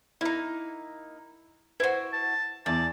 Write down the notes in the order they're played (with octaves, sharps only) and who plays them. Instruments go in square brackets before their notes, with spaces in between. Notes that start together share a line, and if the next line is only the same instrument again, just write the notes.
[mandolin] A#3 D#4 [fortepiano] E4
[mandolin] E4 F#4 [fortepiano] B4 C5
[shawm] A5
[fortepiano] E2 [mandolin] D5 [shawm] A5